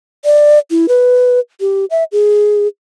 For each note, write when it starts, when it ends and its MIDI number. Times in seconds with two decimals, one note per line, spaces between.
0.25 0.59 74
0.71 0.86 64
0.88 1.40 71
1.60 1.85 67
1.91 2.04 76
2.12 2.68 68